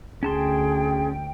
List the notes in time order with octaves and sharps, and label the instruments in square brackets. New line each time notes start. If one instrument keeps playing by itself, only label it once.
[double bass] D2 [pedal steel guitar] C#4 A5 C6 [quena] G#4 [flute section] G5